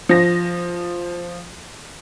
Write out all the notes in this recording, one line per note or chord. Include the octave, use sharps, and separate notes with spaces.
F3 A#6